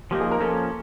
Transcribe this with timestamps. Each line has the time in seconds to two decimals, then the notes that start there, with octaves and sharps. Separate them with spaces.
0.11 F3 A#3 D#4 G4
0.21 G#4
0.31 A#4
0.41 F3 A#3 C#4 A4